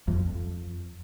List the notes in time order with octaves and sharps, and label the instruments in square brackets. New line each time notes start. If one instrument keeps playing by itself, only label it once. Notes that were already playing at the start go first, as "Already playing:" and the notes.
[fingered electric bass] F2